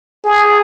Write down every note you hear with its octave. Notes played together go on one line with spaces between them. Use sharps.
G#4